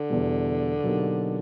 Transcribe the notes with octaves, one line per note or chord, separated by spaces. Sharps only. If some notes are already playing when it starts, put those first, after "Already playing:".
Already playing: D3
E2 B2 G3
B2 F#3 A#3 D#4 G4